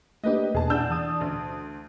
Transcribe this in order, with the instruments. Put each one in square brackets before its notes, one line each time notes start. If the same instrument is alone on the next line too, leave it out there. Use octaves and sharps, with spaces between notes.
[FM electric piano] A3 A#3 D4 [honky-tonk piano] G4 B4 D#5
[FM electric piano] E2 B2 [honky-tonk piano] G#4 A5
[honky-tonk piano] D4 E6 G6 [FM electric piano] E4 F#5
[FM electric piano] E3 A5 D#6
[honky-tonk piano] D2